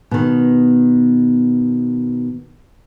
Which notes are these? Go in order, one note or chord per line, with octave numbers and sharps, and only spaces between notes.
B2 D#3